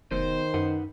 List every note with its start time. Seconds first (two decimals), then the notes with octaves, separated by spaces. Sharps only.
0.12 F1 B2 D#3 C5
0.54 F#2 D#4 B4 F#5